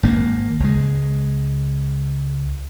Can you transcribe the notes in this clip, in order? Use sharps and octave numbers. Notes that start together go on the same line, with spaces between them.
G#1 A#3
C#2 G#3